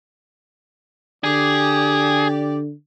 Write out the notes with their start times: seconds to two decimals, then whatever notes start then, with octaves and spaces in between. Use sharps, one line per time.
1.24 D3 G4 G#4 D5